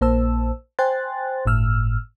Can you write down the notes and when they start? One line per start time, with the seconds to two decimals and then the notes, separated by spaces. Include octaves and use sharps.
0.01 A#1 A#3 C5 A5 E6
0.79 C5 G5 G#5 C6 F#6 A6
1.46 G1 A2 E6 F6